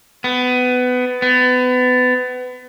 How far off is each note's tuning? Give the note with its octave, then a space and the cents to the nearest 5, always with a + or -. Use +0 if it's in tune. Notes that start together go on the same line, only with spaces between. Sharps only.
B3 +20
B3 +30